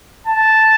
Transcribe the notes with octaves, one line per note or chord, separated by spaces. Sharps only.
A5